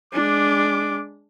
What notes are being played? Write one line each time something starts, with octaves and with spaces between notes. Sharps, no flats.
G#3 D4 D6